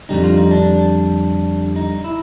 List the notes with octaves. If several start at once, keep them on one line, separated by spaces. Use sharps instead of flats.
F2 D3 G3 D#4
F4
D#4
D4
D#4
E4